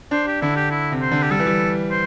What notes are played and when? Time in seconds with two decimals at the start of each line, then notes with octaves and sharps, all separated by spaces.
0.11 D4 C5
0.27 G4
0.42 D3 E4
0.56 G4
0.71 E4
0.92 C3
1.01 C5
1.11 D3
1.23 G4
1.31 G3 A4
1.39 E3
1.47 G3
1.91 C5